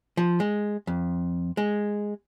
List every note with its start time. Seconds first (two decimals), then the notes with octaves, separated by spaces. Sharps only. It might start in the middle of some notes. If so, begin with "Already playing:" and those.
0.17 F3
0.40 G#3
0.87 F2
1.57 G#3